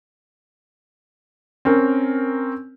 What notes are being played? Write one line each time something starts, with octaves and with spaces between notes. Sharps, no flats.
C4 C#4 A#4